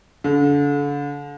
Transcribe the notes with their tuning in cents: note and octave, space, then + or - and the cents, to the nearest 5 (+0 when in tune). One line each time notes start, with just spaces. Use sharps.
D3 -35